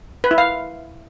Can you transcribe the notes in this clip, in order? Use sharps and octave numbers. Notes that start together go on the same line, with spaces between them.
B4
E4
F5